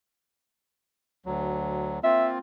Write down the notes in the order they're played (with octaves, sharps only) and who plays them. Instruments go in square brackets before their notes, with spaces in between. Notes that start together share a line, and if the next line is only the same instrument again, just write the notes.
[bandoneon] D2 F#3
[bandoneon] A#3 C4 F4 [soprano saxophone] E5